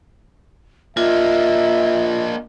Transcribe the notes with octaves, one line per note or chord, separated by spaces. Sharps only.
A#3 D4 F4 D#5 E5